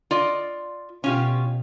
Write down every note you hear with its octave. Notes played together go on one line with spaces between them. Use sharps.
F4 D5 D#5
B2 C#4 F4 G4